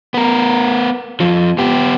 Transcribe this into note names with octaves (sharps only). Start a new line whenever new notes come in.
B3 A#4
F2 F3
B3 G4